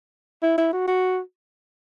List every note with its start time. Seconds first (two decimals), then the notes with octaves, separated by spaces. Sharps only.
0.43 E4
0.58 E4
0.73 F#4
0.87 F#4